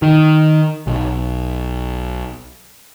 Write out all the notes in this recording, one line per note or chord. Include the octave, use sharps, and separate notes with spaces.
D#3
B1